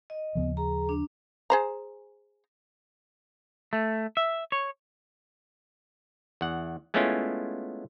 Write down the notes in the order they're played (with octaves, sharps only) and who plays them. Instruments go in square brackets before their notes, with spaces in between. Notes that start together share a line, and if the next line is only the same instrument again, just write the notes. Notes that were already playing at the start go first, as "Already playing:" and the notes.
[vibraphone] D#5
[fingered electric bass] D#2 C#3 F3 [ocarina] B3
[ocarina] G#4 [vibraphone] A#5
[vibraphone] D4
[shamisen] G#4 C5 A#5
[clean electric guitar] A3
E5
C#5
[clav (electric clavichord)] E2 F#5
G#3 A3 B3 C#4 E4 F4